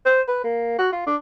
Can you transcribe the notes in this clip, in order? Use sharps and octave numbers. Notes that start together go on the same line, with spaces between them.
C5
B4
A#3
F#4
F4
D4